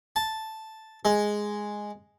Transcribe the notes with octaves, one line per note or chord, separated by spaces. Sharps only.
A5
G#3